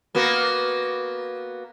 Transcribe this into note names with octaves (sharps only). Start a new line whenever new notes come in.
A#3 B3 F#4